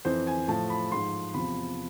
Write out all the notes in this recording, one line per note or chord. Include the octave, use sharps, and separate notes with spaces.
F2 E3 C5
G#5
A2 F3 A5
B5
G#2 F3 C6
E2 C3 F3 B5